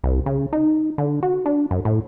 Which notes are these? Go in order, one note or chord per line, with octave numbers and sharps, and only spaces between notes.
C2
C#3
D#4
D3
F#4
D4
F#2
A2